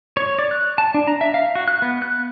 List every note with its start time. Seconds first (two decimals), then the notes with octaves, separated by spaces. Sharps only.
0.17 C#5
0.39 D5
0.51 F#6
0.78 A5
0.94 D4
1.07 A#5
1.21 E5
1.34 F5
1.55 F#4
1.68 F#6
1.82 B3
2.02 F#6